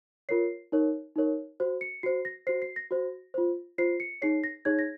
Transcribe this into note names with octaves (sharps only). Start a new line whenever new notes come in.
F4 A#4 C#5 C7
D#4 A#4 C#5
D#4 A#4 C#5
F#4 C5
C#7
F#4 C5 C7
A#6
F#4 C5 C7
C7
A#6
F#4 C5
F4 C5
F4 C5 C7
C#7
D#4 G#4 C#5 C7
A#6
D#4 G#4 C#5 G#6
A#6